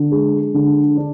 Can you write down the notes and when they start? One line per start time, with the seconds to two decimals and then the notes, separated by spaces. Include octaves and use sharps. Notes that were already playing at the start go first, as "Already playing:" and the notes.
Already playing: D3
0.12 G#3
0.54 D3
0.97 D4